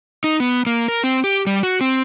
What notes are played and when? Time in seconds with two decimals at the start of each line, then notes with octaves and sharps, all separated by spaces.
0.24 D#4
0.40 B3
0.67 A#3
0.88 A#4
1.04 C4
1.24 G4
1.47 G3
1.63 F#4
1.81 C4